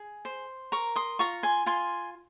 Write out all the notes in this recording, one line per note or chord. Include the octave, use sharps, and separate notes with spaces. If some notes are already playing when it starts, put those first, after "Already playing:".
Already playing: G#4
C5
A#4 A#5 C#6
C6 D#6
F4 A#5 C#6
G#5 C6
F4 G#5 C6